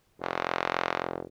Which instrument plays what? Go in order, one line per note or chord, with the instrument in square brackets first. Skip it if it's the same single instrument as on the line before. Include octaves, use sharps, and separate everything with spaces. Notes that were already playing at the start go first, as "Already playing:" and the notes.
[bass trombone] F1